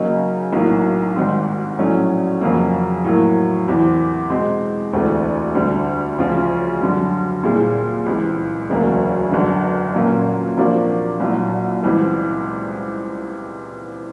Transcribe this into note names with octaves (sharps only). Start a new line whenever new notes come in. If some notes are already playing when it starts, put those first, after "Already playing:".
Already playing: C#3 F#3 A#3 D#4
B1 A2 F#3 A#3
G#1 G#2 D#3 G3 C4
A#1 A2 F#3 A3 C#4
F2 C#3 F#3 A#3
A2 F#3 A#3
E2 C3 E3
B2 G#3 C4
E1 D2 C3 E3 A3
D2 D3 G3
D2 C#3 F3
F#2 D3 G3
A#2 G3 C4 E4 G#4
C#2 C3 E3
E1 D2 C#3 F#3 A#3
G1 F#2 D3
A#2 F#3 A#3 C#4
C3 F3 A#3 D4 F#4
C2 A#2 F#3
C#2 C3 E3 G3